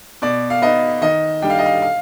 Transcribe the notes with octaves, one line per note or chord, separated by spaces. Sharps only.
B2 D5
F5
B3 D#4 D#5
D#3 D#5
G3 D4 G5
F5
D#5
F5
F5